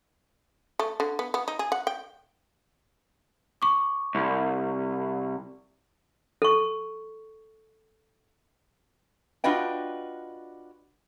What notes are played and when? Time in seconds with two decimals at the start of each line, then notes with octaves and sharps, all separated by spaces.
0.79 A3
1.00 D3
1.19 B3
1.34 B3
1.48 D#4
1.59 G#4
1.72 F#5
1.87 G5
3.62 C#6 D6
4.15 C2
6.42 A4 C#6
9.44 D4 F4 F#4 B4 D#5 G5